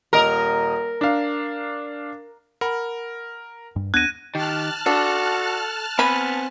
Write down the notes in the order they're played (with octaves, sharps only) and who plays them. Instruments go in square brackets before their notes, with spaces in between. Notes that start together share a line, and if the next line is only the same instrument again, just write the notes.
[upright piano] D#1 D#5 [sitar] A#4
[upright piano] D4 F5
[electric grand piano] A#4 [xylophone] F#5 B5
[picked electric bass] G2
[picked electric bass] D#2 B3 D4 [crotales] F#6 D#7 [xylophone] G#6 A#6
[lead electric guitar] D#3 [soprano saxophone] G4 [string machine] A5 F6 F#6
[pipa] D4 [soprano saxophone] F#4 [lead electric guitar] A4
[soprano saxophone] B3 [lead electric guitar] C4 G#5 [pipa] B5